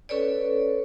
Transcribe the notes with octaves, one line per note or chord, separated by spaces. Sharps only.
C#4 A4 B4 C#5 D5